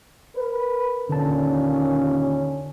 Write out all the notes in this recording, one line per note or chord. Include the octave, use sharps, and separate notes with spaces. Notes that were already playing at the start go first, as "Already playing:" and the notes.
A#4 B4
D#2 A#2 D3 C#4 A5